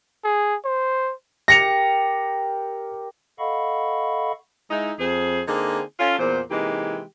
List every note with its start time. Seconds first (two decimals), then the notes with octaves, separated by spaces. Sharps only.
0.24 G#4
0.65 C5
1.48 G4 A#4 E5 A#6 C#7 F7
3.39 A4 D#5 F5 F#5 B5 C#6
4.71 G#3 D#4 E4
4.99 F2 G#4 C5
5.48 D3 A#3 C4 D#4 G#4
6.00 C#4 F4 A4
6.19 E2 A#2 C5
6.51 C3 E3 G#3 A#3 D#4 G4